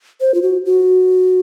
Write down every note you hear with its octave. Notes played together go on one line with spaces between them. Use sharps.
C5
F4
F#4
F#4